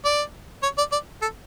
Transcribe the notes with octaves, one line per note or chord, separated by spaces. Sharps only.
D5
C#5
D5
D5
A4